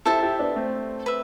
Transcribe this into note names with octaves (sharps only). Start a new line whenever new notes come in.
E4 G4 A4 C5 E5 A5
E4 G4
B3 D4
A3 C4
B4 E5